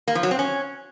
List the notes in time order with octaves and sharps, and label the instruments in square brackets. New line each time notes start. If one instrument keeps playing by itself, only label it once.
[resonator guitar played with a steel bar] A#3
F3
F#3
C4
C#4